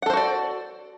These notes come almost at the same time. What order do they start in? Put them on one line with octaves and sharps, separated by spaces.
F#5 A4 C5 F#4 D5